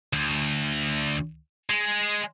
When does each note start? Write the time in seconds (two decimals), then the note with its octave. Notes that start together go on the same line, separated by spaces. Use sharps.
0.13 D2
1.70 G#3